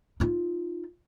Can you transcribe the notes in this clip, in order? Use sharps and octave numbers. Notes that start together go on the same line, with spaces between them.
D#4 F4